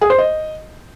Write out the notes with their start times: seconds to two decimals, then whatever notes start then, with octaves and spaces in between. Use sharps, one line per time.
0.01 G#4
0.10 C5
0.18 D#5